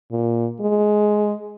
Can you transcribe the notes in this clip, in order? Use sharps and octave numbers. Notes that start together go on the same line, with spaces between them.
A#2
G#3